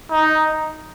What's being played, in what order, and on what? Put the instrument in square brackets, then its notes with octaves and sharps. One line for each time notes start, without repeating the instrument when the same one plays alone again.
[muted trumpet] D#4